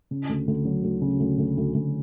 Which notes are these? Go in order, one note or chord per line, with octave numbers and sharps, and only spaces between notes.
C#3
D2
D2
F#3
D2
C#3
D2
D2
D2
D2